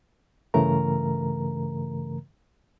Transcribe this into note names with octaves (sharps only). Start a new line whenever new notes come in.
G2 C#3 E3 A3 A#4 A#5